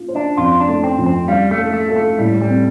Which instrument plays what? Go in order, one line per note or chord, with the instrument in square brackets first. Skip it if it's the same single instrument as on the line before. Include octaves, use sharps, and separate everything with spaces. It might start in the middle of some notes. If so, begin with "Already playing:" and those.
Already playing: [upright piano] F4
C5
[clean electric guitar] D4
[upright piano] F2 [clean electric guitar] F4
[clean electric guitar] D4
[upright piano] A3
[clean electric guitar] C4
[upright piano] F2
[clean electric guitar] C4
[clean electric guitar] G3 [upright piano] F5
[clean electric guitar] A3
[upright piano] A4
[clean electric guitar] A3
[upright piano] A4
[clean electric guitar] A3
[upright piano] A2 [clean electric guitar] G3
[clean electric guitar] G3
[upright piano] C4